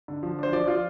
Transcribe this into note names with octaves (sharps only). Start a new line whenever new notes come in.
D3
F3
D4 C5
F3 D5
F4